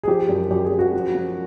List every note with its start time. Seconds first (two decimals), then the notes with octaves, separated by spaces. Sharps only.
0.03 G#4
0.08 F3 G4
0.29 F#2
0.51 F#2 G4
0.65 G#4
0.72 F#2
0.79 F#4
0.93 F3
1.15 F3